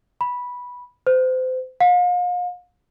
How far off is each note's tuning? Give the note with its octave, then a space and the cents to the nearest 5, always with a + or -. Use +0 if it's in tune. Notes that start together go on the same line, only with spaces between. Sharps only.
B5 -10
C5 -30
F5 +40